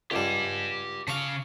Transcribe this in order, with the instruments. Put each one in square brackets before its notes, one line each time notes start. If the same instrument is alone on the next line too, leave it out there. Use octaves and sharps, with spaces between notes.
[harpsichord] C#2 G#2 G3 [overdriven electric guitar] G4 A5
[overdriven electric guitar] C#3 F5 [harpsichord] A5 C#6 D6